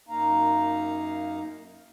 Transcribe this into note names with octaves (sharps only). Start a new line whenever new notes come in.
F#2 A#3 D#4 F5 A#5